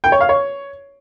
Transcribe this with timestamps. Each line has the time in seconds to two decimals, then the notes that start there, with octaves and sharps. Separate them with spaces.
0.04 G5
0.12 C#5
0.21 F5
0.29 C#5